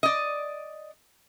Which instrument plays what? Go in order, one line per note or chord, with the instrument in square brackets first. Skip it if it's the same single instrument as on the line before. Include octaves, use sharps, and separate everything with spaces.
[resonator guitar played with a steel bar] D5 D#5